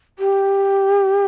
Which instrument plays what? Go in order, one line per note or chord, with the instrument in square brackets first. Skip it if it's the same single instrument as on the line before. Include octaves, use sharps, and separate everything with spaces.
[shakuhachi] G4